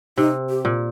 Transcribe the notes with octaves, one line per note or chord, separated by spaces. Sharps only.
C3 D#4
G4
A#2